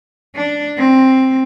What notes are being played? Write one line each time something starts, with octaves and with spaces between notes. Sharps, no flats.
D4
C4